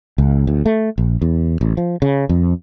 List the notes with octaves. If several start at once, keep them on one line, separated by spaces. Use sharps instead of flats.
C#2
D2
A3
A#1
E2
A1
F3
C#3
F2